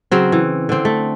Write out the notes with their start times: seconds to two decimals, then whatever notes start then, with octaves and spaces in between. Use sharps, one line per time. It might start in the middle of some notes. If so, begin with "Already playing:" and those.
0.12 C#3 F#3 C4
0.32 E3
0.69 D3 C4
0.85 A3